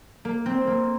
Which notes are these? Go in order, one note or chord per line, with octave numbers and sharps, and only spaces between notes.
A#3
C4
A#3